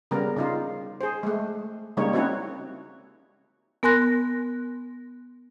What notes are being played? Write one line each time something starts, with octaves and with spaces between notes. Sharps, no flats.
C#3 G3 B3 A#4
C#3 D#4 F4
G#4 C5
G#3 A3
C#3 G3 G#3 A#3 D#4 C#5
C4 C#4 D#4 E4 F#4 C#5
B3 A#4 G#5 C6 F#6 A#6